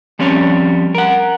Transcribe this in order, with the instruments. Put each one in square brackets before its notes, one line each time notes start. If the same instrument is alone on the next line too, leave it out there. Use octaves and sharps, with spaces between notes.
[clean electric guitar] F3 G3 C4 C#4 C#5
A#4 F#5